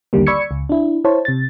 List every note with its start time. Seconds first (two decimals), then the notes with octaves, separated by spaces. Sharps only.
0.13 A#1 D#2 D3 D#3 G3 A#3
0.27 D5 B5 C#6 E6 G#6 C#7
0.51 C#2
0.69 D4 E4
1.05 E4 C5 C#5 A5
1.25 C3 A6